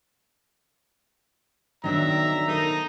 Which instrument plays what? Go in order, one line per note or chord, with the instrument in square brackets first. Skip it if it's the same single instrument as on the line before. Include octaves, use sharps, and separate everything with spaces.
[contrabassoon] B1 [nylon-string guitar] D#3 D4 D5 [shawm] E5 [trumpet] A#5
[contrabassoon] D#3 [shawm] D#4 [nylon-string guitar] A4 C5